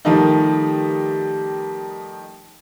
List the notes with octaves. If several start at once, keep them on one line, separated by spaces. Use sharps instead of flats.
D#3 F3 G3 A3 D#4